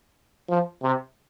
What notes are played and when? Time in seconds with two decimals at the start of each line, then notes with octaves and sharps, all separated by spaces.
0.49 F3
0.83 C3